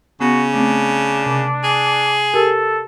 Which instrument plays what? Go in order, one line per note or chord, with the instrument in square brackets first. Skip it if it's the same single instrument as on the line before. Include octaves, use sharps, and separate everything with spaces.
[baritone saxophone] C#3 [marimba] B3 [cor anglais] F#4
[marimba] A3 C4 [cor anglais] D4
[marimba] C3
[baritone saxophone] G#4
[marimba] G4 A#4 [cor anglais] A4